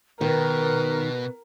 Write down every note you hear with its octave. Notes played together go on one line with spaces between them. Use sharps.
B2 D#3 A#4 B4